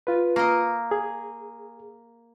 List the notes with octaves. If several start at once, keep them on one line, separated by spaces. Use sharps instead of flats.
F4 B4
A#3 D#5
G#4